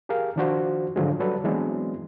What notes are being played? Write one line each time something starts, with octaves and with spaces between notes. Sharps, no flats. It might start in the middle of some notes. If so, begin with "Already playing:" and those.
G4 G#4 A#4 F5
D#3 F3 D4 F4 F#4 C5
G#2 D3 D#3 F3 F#3 G#3
F#3 G3 A4 B4 D5
E3 F#3 G#3 B3 C4 D4